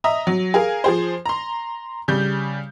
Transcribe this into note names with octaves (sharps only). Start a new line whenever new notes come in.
D#5 E5 A#5 D#6
F#3
G#4 A#4 F5 G#5
F3 G#4 C5
A#5 C6
C#3 G3 G6